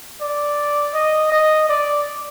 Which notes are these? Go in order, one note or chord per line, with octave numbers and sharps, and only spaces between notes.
D5
D#5
D#5
D5